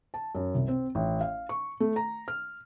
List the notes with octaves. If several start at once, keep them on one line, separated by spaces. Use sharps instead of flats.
A5
F#2
C2
C4
A1
F5
C#6
A3
A#5
F6